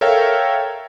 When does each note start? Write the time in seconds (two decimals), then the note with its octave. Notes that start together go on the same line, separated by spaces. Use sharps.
0.01 A4 A#4 C#5 E5 F5 G5